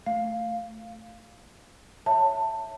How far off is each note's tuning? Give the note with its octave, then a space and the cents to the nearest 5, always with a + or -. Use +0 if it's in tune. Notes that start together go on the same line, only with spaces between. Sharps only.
A3 +0 F5 +0
C#5 +0 E5 +0 A5 +20